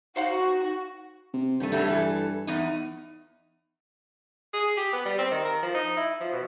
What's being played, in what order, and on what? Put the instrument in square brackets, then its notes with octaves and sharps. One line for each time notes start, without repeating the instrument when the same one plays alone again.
[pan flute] D#4 [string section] F#4 [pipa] C5 F5 F#5
[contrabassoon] C3
[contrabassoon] G2 [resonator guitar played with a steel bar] D#3 A3
[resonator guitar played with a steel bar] F#3 G3 A3
E3 A4
E2 D#4
[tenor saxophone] G#4
G4
B3
G3
C4
D#3
A#4
F3
D#4
E4
F3
B2